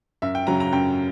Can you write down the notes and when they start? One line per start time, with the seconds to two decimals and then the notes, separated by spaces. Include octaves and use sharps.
0.22 F#2 E5
0.35 G5
0.47 C#3 F#3 A#5
0.60 A#5
0.73 F#2 G5